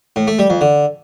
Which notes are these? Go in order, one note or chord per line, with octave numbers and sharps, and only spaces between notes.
A2
A3
G3
F2
D3